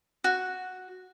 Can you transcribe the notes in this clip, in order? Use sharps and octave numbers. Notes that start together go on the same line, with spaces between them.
F#4